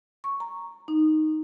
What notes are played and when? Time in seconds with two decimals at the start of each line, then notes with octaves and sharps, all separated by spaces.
0.24 C#6
0.40 A#5
0.88 D#4